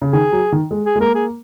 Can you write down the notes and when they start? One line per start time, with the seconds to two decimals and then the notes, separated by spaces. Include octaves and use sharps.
0.02 C#3
0.12 D#3 G#4
0.32 F#3
0.52 D#3
0.71 G#3
0.86 G#4
0.96 G#3
1.00 A#3 A#4
1.15 G#4